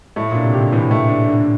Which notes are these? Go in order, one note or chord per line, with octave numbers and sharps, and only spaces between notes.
A2 A3
A#2 D4
C3
D3 G4
A2 E3
A3
D4
D3